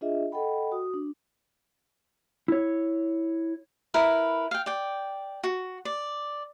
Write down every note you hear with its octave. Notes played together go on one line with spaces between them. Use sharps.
D4 F4 G#4 D#5 E5
A4 D#5 F#5 G5 B5
F#4 D#6
D4
E4 C#5
E4 A#4 B4
F5 G5
D5 G5
F#4
D5